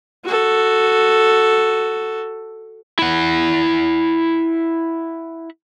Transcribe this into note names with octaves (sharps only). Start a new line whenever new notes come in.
F#4 A4
E4 F#5